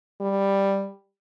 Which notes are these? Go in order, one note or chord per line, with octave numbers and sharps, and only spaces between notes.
G3